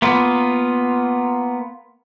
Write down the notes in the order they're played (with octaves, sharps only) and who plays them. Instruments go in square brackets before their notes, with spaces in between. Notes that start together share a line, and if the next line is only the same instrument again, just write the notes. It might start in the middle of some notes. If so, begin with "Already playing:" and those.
[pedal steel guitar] A#3 B3 F4